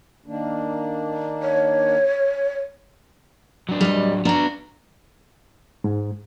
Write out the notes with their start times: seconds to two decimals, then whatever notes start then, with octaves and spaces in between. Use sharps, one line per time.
0.26 D#3 A#3 D4
1.43 C#5
3.69 F#3 D4
3.81 G3 D#5
4.25 B3 D4 F#4 A#5
5.84 G#2